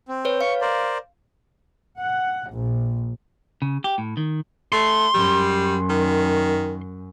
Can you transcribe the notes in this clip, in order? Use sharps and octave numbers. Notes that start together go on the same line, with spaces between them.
C4
B4 C#5
F5 C#6
A#4 C5 D5
F#5
A#1
C#3
G4
A2
D#3
A3 C6
F#2 G3
D#3